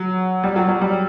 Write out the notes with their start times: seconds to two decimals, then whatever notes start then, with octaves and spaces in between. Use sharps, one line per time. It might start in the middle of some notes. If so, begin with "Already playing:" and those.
Already playing: F#3
0.44 G3
0.56 F#3
0.69 F#3
0.81 G3